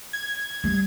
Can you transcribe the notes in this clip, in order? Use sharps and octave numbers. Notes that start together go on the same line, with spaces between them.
G#6
G3